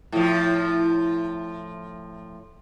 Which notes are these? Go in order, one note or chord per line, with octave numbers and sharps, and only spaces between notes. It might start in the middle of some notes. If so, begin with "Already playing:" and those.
A2 F3